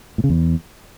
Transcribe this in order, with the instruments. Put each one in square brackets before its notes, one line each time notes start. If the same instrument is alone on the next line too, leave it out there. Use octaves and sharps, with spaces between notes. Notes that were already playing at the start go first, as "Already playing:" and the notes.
[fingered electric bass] A2
C#3
E2